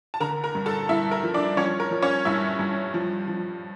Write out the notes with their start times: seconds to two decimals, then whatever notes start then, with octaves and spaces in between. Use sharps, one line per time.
0.14 A5
0.20 D3 A#4 A#5
0.44 A#4 A#5
0.55 G2
0.66 A4 A5
0.89 G2 E4 E5
1.11 A#4
1.23 F3
1.34 D4 D5
1.57 F3 C#4 C#5
1.80 A#4
1.91 F3
2.02 C#4 C#5
2.25 G2 E4 E5
2.59 G2
2.94 F3
3.28 F3